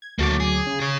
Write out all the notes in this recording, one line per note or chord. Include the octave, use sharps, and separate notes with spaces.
G#6
D2 F#3 A#3 A4 D6
G#4
C#3
G#4 C#5